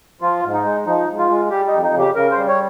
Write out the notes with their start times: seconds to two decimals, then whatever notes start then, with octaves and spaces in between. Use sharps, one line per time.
0.21 F3 F4
0.44 G#2
0.54 D#4
0.65 G#3
0.86 F3 D#4
1.08 G#2
1.18 F4
1.29 G#3
1.50 G3 G4
1.67 D#4
1.73 F2
1.84 D#4
1.94 C#3
1.99 G4
2.15 C#3 A#4
2.31 C5
2.37 G3
2.48 C#5